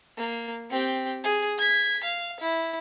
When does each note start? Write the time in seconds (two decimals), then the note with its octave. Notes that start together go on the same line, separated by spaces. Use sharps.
0.17 A#3
0.71 C4 G4
1.24 G#4
1.58 G#6 B6
2.04 F5
2.41 E4